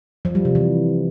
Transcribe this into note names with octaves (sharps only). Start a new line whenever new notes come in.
F3
G3
C3
E3